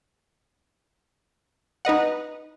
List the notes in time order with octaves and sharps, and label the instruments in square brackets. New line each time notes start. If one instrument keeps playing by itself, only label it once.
[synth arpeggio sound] D#4 B4 D#5 F#5